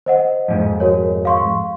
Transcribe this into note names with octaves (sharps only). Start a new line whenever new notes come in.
C5 D#5 F#5
F2 G#2
F#4 A#4 C#5
F5 C6 C#6